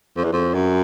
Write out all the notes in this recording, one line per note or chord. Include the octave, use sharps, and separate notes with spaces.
F2
E2
F2
F#2